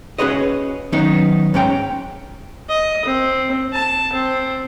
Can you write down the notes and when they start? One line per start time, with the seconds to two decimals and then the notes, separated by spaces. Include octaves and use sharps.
0.18 C#4 F#4 G#4 B4 C#5 D#5
0.92 D#3 F#3 B3 C#4 D#4
1.54 G#2 C#4 G5 A#5
2.68 D#5
3.05 C4
3.73 A5
4.13 C4